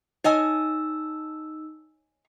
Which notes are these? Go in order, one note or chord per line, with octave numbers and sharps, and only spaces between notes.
D#4 C#5 D#5 G#5 E6